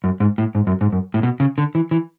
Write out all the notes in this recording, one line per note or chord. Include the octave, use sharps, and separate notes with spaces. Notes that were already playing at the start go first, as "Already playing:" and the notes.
F#2
G#2
A2
G#2
F#2
G#2
F#2
A2
B2
C#3
D3
E3
E3